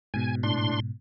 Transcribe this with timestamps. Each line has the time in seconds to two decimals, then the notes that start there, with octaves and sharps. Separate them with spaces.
0.14 G#2 B2 G#5
0.43 A2 D4 C6